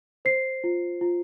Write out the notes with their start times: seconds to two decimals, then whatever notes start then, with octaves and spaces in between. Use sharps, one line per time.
0.25 C5 C7
0.64 F4
1.01 F4